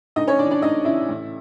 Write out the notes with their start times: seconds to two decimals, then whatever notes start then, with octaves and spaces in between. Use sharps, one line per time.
0.16 D2 D#4 D#5
0.27 C#4 C#5
0.39 C#3 E3 D4 D5
0.51 D4 D5
0.62 D2 D#4 D#5
0.85 C#3 E3 E4 E5
1.08 A1